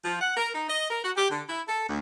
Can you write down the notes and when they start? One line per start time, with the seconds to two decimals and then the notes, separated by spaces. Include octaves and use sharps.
0.04 F3
0.20 F#5
0.35 A#4
0.53 D#4
0.68 D#5
0.89 A#4
1.03 F#4
1.15 G4
1.29 D3
1.47 E4
1.68 A4
1.87 D2